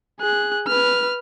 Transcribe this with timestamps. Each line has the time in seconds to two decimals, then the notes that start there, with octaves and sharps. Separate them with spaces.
0.21 G#4 F#6
0.67 B4 F6